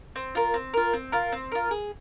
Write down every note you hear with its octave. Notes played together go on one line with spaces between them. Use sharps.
C4
F4 A#4
C4
F4 A#4
C4
F4 A#4
C4
F4 A#4
G#4